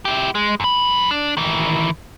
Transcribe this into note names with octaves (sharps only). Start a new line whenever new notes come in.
E4 G4
G#3
F#2 B5
D4
D#3 E3